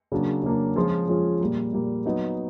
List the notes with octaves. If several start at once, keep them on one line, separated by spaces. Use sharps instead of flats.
C#3 F#3 A#3 D4
C#3 F#3 A#3 D4
F3 G#3 C#4 F4 G#4
F3 G#3 C#4 F4 G#4
A#2 G3 A#3
A#2 G3 A#3
F#3 B3 D#4